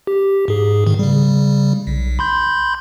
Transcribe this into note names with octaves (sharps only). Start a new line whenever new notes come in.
G4
G#2 G#4
G#2 D#3
C#3 G3
B1
B5 C6 G6